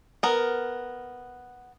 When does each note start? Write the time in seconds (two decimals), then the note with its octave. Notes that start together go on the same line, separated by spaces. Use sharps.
0.23 B3 A#4